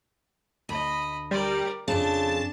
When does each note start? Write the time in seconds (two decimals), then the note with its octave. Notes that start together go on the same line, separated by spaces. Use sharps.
0.69 D2 D#5 B5
1.31 G3 A#4 D5
1.88 F2 C#3 C4 D4 A5